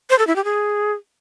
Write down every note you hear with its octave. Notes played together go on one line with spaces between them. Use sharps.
C5
A4
E4
G4
G#4